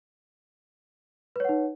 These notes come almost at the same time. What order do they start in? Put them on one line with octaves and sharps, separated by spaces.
B4 C#5 F#5 D#4